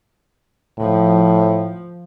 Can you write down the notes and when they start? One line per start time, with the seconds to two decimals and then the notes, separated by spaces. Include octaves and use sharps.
0.79 A2 F3